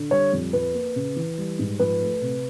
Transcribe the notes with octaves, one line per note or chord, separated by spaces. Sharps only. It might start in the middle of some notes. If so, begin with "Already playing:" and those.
Already playing: D3
G3 C#5
F2
F3 B4
A#3
C#3
E3
G3
G#2
F3 B4
A3
C3